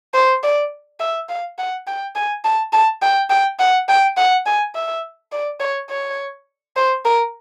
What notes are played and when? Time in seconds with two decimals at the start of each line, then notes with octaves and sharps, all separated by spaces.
0.14 C5
0.43 D5
1.00 E5
1.29 F5
1.58 F#5
1.87 G5
2.15 G#5
2.44 A5
2.73 A5
3.02 G5
3.30 G5
3.59 F#5
3.88 G5
4.17 F#5
4.46 G#5
4.75 E5
5.32 D5
5.60 C#5
5.89 C#5
6.76 C5
7.05 A#4